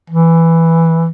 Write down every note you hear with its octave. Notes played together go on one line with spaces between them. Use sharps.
E3